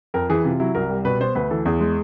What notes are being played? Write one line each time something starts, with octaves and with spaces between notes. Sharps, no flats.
F2 A#4
E3 G#4
C3 F4
F#3 E4
C2 A#4
G3
B2 B4
B3 C5
D2 B4
E3 A4
E2 G#4
G#3